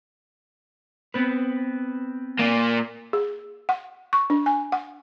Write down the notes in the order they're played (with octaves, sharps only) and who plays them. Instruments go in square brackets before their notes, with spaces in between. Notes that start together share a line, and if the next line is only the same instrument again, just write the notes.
[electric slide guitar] B3 C4 B4
[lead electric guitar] A#2 A#3
[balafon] G#4
F#5
C#6
D4
G#5
F#5